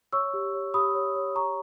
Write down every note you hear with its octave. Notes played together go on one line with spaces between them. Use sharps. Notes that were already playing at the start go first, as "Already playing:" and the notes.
C#5 C#6 E6
G4
C#5
G4 B5 D#6
C#5
C#5
G4 A#5 C#6